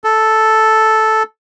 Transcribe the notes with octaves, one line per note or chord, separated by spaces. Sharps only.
A4